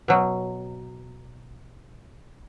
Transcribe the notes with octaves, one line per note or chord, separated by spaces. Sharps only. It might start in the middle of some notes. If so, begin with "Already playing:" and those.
B2 F#3